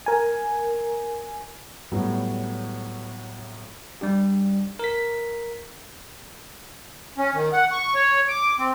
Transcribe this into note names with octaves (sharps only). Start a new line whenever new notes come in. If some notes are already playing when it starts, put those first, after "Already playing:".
A#4 G#5
A2 F#3 G3 B3
G3 D4 G4
A#4 B6
C#4
D#3
F#5
C#6
C#5
D6
C4